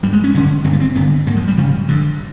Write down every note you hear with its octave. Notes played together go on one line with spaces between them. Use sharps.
G#2 G3
G#3
C#4
F#2 D3 C#4
G2 D3 C4
B3
C4
G2 D3 B3
G#2 A#3
F3
G3
F2 C#3 F3
G2 D3